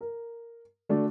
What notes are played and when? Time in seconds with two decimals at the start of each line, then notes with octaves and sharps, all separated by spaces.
0.01 A#4
0.89 D3 A3 D4 F#4